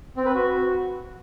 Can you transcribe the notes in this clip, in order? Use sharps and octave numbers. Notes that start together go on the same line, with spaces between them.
C4
B4
F#4